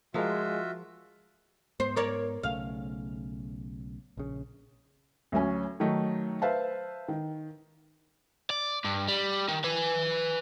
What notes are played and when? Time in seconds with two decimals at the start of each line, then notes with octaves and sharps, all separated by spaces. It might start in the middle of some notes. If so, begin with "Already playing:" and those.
0.14 F3 G#3 F4 F#4 A#4 E5
1.80 G#2 B3 C5
1.96 A#4 C#5 D5
2.43 B1 C#3 A3 F5
4.17 A#1 C#3
5.32 D2 F#3 C#4 G#5
5.80 D#3 F#3 A3 D#4
6.42 B4 C5 E5 F5 A5
7.08 D#3
8.50 D5
8.85 G2
9.08 G3
9.48 D#3
9.64 B4 G#5